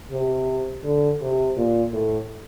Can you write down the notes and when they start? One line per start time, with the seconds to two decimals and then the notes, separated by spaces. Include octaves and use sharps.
0.11 C3
0.84 D3
1.21 C3
1.57 A#2
1.93 A2